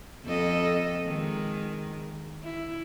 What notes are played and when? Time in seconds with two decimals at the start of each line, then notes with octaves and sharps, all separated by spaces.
0.25 F2 A4 D#5
1.07 D#3 G#3
2.43 E4